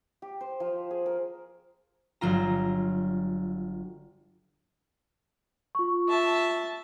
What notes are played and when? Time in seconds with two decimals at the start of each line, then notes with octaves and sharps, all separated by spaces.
0.22 G4
0.41 C5
0.60 F3
0.91 G#4
1.06 A#4
2.21 G1 F#3 F4 A#5
5.75 F4 C#6
6.08 E5 A5